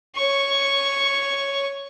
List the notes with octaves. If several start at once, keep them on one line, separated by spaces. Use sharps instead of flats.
C#5 C#6